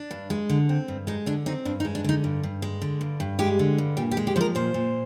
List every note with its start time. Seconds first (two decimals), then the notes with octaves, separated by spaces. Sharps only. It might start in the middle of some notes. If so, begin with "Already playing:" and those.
Already playing: D4
0.11 G2
0.30 G#3
0.49 D3
0.69 C4
0.88 G2
1.07 G#3 D#4
1.26 D3 D4
1.46 C4 D#4
1.65 G2 D4
1.80 D#4
1.85 G#3
1.95 D4
2.04 D3 D#4
2.24 G2
2.43 G2
2.62 G#3
2.82 D3
3.01 G2
3.20 G2
3.39 G#3 G4
3.59 D3
3.78 G2
3.97 A#2 G4
4.11 G4
4.17 G#3
4.27 G4
4.36 F3 A#4 C5
4.55 A#2 C5
4.74 A#2